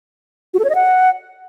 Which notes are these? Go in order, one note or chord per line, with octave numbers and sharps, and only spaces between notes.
F#4
A4
C#5
D#5
F#5